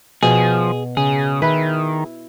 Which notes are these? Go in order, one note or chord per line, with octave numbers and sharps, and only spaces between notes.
B2 F3 G#4
C#3 G#4
D#3 E4 B4